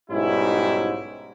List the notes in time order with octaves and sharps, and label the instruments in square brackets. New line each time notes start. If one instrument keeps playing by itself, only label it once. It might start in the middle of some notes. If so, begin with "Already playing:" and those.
[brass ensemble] B1 G#2 G3 C#4 E4